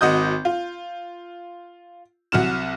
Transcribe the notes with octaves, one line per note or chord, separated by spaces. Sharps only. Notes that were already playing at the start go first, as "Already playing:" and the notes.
G#1 F#4 D#5 D#6 G6
F4
C2 F#3 F#4 F6 E7